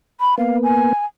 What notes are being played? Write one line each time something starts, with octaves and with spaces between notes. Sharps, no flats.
B5
A#3 B3 F5
G#5